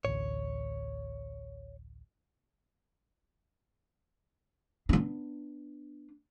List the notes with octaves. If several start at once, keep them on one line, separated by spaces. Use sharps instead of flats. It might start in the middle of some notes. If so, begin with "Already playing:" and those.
A1 D2 C#5
B3 D4